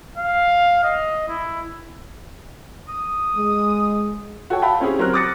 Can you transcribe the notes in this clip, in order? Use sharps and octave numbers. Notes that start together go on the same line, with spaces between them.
F5
D#5
E4
D#6
G#3
F#4 A4 C#5 G5
E5 F5 G5 A5 B5
C4 C#4 E4 G4 G#4
F#3 C4 A#4 F6 F#6
D6 D#6 F#6 A6 A#6 C#7